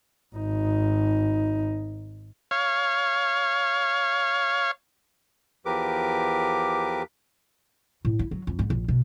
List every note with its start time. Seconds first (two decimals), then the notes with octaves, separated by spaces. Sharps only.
0.35 G#1 D#4
2.51 C#5 F5
5.66 E2 F3 G4 A#4 B4 D6
8.05 A2
8.19 E4
8.31 F#3
8.47 F2
8.59 G#2
8.70 A#1
8.88 B2